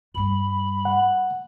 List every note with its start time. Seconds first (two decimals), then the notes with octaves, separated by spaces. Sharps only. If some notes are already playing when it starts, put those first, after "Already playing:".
0.15 G2 G3 B5
0.85 F#5